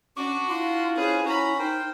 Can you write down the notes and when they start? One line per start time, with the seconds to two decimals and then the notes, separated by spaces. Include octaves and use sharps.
0.17 C#4 D4 F#4 C#6 D6
0.49 E4 F4 C6
0.96 C#4 G#4 B4 C5
1.25 C#4 F#4 A#5 B5
1.59 D#4 A#4 C5 G5